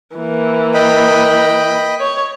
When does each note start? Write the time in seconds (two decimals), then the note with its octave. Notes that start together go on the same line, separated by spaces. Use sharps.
0.16 E3 A#3
0.74 D#5 G5 B5
2.00 C#5